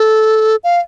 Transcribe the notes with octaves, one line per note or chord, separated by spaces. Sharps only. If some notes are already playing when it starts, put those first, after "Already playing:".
Already playing: A4
F5